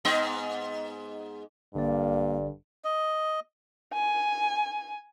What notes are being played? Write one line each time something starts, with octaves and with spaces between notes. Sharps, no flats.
G#2 B3 D#5
A1 G2 D3 A#3 D5
D#5
G#5